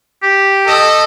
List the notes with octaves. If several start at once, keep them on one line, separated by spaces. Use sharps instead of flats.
G4
A4 D#5